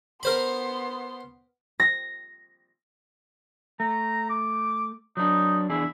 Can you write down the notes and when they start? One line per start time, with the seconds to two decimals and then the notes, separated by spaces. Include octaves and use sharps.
0.23 B3 A#4 C5 B5 C6
1.80 A#6
3.80 A3 A#5
4.30 D6
5.17 F#3 D4 D#4
5.69 E2 D4 E4 G#4